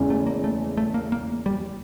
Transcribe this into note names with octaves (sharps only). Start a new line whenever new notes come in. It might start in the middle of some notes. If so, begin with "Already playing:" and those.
Already playing: E2 C#3 E3 G#3 C#4
A3
A#3
A3
A3
A#3
A#3
G3